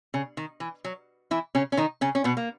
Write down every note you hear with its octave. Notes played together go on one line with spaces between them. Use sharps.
C#3
D#3
E3
F#3
E3 E4
C#3 C#4
C#4
D#3 D#4
C#3 C#4
C#4
B2 B3
A#3